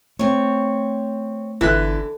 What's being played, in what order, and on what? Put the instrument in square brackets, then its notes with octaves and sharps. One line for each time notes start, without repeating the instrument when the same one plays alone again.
[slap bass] A3 [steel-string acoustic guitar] C4 C#5
[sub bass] G1 [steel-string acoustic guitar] D3 [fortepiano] E3 E5 F#6